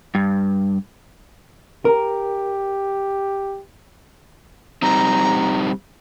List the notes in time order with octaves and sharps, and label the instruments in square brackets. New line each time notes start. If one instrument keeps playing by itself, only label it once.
[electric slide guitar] G2
[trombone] G4 [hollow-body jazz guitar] A#4
[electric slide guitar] G3 C4 D#4 [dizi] A#5